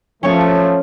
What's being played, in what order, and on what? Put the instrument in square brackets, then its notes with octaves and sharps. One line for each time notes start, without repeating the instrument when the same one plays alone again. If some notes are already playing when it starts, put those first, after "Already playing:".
[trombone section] F3 A3 [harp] C#4 C#5